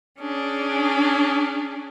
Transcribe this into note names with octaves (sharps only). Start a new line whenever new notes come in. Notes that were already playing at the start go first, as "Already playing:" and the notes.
C#4 D4 G#4